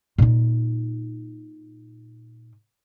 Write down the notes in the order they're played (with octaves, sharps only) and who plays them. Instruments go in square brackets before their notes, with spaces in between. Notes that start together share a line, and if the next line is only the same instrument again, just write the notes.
[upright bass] A#2 D#4